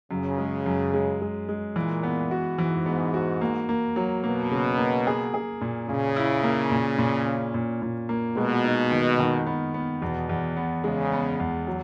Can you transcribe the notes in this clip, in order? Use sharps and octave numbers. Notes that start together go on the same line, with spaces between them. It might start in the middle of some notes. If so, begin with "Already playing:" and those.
F#2 C#3
G#3
F#2
G#3
G#3
G#3
A#2 E3
B3
F#4
G#2 E3
B3
F#4
A#3
A#3
F#3
B2 A#3
C#3
A#3
G#4
G#4
A#2
A#2 C#3
E4
A#3
A#2
A#2
C#4
A#2
A#2
A#3
B2 G#3
D#4
D#3
D#3
B3
B3
E2 B2
E2
B3
C#3 G#3
B3
E2
F#3